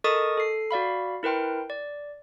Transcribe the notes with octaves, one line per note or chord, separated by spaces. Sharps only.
A4 A#4 D#5 C#6 D#6 A6
A4 C7
F#4 D5 F5 B5
E4 A#4 B4 G5 C6
D5